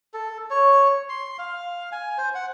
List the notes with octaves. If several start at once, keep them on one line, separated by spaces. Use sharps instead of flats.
A4
C#5
C6
F5
G#5
C5
F#5